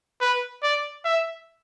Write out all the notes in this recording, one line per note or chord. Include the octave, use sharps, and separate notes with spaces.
B4
D5
E5